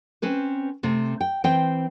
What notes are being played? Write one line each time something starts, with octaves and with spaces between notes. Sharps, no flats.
C4 C#4 B4 C5
C3 A3 C4
G5
E3 C4 C5 G5